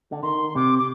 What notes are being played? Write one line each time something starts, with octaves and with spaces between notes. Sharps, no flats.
D3
D#3 C6
C3 D6
D6